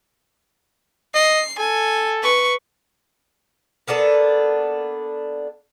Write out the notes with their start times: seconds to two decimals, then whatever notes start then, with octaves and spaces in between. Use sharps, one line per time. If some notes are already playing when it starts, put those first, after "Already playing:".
1.14 D#5 C7
1.59 A4 G#5
2.22 B4 C#6
3.87 A#3 B3 D4 A4